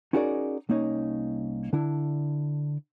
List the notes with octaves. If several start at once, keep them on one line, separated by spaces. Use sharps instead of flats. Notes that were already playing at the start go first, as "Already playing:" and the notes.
C#4 D#4 F#4 G#4 A#4 D5
C2 A#3 C#4 D#4 C#5
D3 D4 E4